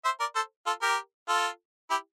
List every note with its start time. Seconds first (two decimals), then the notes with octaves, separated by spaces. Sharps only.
0.04 C5 E5
0.20 A#4 D5
0.36 A4 C5
0.66 F4 A4
0.82 G4 A#4
1.28 F4 A4
1.90 E4 G4